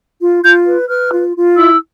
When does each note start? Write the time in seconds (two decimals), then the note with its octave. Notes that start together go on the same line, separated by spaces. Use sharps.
0.20 F4
0.43 F4 G6
0.66 B4
0.89 B4 F6
1.11 F4
1.34 F4
1.57 E4 E6